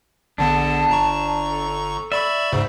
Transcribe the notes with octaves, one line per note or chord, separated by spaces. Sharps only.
A#1 D3 B3 D4 A5
G1 A#5 C#6
A4
D5 E5 B5 C#6
D2 G#2 C#3 C5